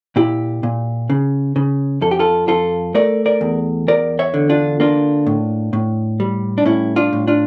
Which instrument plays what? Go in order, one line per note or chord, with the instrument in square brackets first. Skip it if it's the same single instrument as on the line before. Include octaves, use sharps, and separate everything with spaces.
[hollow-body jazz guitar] A#2 E4 G4
A#2
C#3
C#3
F2 A4
G4
F4 A4
F2 F4 A4
A3 A#4 D5
A#4 D5
E2
E2 A#4 D5
C#5 E5
D3
D4 F4
A#3 D4 F4
A2
A2
G3
D4
A2 C#4 E4
D4 F4
A2
D4 F4